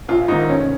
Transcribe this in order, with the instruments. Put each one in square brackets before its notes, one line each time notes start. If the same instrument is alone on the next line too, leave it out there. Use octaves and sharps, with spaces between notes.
[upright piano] A#1 F4
G#2 D#3 D#4
F1 C#4